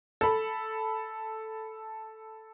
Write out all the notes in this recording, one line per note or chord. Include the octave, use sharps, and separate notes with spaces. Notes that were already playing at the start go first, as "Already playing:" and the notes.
A4 B5